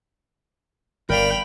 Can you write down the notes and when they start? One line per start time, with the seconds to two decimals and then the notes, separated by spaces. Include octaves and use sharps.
1.10 G1 A#4 D5 F5 G5 B5 F7